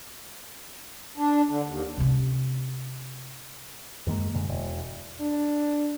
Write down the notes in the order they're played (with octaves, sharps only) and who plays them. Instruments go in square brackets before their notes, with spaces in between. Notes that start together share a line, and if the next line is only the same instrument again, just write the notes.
[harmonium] D4
D3
D#2
[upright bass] C3 C#4
[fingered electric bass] F#2 D#3 G#3 A#3
F#2 B2 D3 G#3
E1
[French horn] D4